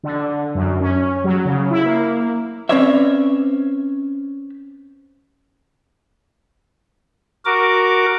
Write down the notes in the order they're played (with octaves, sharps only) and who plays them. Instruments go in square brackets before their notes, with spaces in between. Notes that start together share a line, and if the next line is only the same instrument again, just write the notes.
[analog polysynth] D3
F#2
C#4
F#3
C#3
E4
A#3
[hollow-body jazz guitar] C4 C#4 B4 C#5 D5 E5
[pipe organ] F#4 A#4 D6